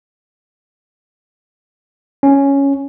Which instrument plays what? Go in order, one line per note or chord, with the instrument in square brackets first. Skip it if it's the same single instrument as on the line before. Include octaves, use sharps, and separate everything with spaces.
[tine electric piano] C#4